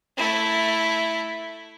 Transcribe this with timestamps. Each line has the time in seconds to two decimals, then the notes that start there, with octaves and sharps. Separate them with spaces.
0.17 A3 E4